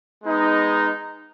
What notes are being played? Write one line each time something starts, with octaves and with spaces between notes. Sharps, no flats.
G#3 B3 D#4